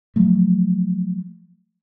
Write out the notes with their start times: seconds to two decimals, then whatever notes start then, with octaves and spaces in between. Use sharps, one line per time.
0.16 F3 F#3 A3